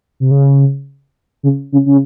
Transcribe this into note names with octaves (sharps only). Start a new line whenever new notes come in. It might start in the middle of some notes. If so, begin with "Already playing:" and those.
C3
C#3
C#3
C#3
C#3